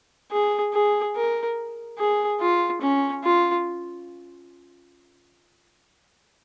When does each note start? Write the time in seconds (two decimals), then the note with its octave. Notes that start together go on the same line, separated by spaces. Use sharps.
0.31 G#4
0.73 G#4
1.16 A#4
1.98 G#4
2.40 F4
2.82 C#4
3.24 F4